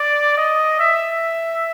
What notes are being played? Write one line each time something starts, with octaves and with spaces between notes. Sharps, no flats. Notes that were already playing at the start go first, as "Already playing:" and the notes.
Already playing: D5
D#5
E5